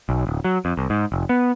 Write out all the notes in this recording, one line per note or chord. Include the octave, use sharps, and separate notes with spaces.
B1
D1
F#3
F2
C2
G#2
F1
B3